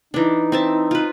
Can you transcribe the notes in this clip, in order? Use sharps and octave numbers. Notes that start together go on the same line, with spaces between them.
E3 D4 D#4
C4 E5 A5
F4 B4